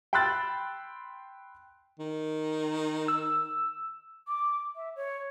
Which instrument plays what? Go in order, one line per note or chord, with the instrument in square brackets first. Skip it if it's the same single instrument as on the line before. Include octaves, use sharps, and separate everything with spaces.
[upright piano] G5 B5 C6 E6 F#6 A6
[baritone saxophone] D#3
[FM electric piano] E6
[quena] D6
E5
C#5